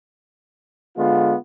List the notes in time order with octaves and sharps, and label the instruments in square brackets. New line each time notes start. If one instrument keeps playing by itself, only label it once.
[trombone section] D3 G#3 B3 F4